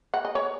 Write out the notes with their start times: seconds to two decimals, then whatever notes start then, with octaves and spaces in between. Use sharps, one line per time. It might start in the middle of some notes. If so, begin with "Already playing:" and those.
0.14 F#5
0.25 D#5
0.35 C#5